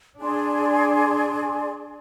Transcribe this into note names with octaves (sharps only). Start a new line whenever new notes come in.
D4 G#4 D5 G#5 C6